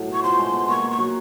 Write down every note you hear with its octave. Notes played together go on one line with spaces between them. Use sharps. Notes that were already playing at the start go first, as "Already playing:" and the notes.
Already playing: A2 F#3
B3 C#6
F3 C6
G#3
B3
A#3 C#6
A#3
C#6
F#3